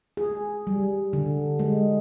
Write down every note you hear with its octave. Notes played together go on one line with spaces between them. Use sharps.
G#4
G3
D3
G#3